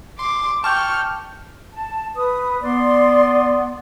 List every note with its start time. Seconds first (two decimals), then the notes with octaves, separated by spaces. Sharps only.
0.19 C6 D6
0.64 G5 A5 C#6 D6 F6 G6
1.73 A5
2.16 B4 D#6
2.63 B3 D5 C6